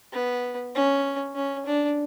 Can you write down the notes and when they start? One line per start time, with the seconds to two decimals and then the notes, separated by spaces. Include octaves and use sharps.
0.13 B3
0.75 C#4
1.35 C#4
1.66 D4